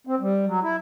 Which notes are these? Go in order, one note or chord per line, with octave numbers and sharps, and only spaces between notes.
C4
G3
F#3
E4